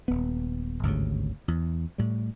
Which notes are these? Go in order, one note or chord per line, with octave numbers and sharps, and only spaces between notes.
D#1 B3
G#1 D2 G2 C#3
E2
A2 G3